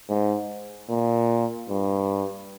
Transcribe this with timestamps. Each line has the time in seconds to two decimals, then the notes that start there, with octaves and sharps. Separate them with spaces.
0.10 G#2
0.90 A#2
1.70 G2